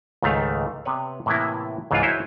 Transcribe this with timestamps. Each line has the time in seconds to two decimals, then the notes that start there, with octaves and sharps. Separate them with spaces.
0.22 C#2 G#2 D#3 A3 F5
0.85 C3 B3 B4 C#5
1.26 A2 C3 E3 A#3 B3 E4
1.91 C#2 G#2 E3 G3 D4 F4
2.03 E4 F#4 G#4 C5 C#5